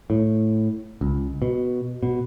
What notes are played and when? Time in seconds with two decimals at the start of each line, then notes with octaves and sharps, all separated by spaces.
0.10 A2
1.01 C#2
1.42 B2
2.03 B2